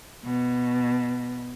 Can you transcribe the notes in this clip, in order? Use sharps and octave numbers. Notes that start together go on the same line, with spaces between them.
B2